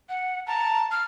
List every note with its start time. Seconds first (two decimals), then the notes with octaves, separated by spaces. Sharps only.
0.09 F#5
0.47 A5 A#5
0.92 F6